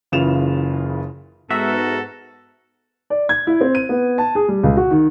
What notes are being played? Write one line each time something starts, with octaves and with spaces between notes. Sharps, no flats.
F#1 C#3 E3 F4 E7 F7
G#2 B3 F#4 A4 A#4 E5
D5
G#6
E4
C4
D#7
B3
A5
G#4
G3
C#2
F#4
D#3